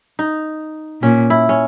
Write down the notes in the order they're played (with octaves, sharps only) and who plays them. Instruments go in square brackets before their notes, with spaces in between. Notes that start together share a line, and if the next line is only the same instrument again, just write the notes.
[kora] D#4
[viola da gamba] A#2 [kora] C#4
[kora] E4
C#4